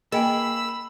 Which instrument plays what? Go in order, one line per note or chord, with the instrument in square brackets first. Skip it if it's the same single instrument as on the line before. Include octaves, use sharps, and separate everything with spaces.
[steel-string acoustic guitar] A#3 G#4 [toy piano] D#5 G5 G#5 [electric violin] B5 [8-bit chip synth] E6